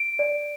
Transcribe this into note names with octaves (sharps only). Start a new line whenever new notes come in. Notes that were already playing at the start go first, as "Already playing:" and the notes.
Already playing: D7
D5